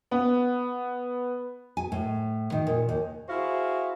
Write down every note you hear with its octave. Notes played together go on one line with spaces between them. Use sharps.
B3
G#5
A2
D#3
A#2
D#2
E4 F#4 G#4 C5 F5